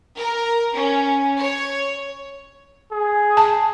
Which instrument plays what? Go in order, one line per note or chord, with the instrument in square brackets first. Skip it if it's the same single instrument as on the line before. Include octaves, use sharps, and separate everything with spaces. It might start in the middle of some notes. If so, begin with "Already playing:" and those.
[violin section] A#4
C#4
C#5
[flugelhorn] G#4
[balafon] A5